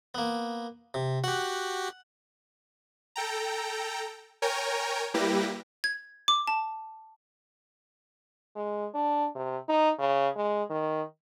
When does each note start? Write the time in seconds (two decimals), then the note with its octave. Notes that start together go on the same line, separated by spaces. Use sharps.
0.15 A#3 B3
0.94 C3
1.24 F#4 G4 F#5
3.16 A4 G5 A#5
4.42 A#4 C#5 G5 G#5 A#5
5.14 G3 A#3 E4 G4 B4 A#6
5.84 G#6
6.28 D6
6.47 A5
8.56 G#3
8.95 D4
9.35 C3
9.69 D#4
9.99 C#3
10.36 G#3
10.70 D#3